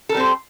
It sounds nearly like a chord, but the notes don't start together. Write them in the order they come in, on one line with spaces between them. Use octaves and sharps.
A4 A#4 G3 C4 C5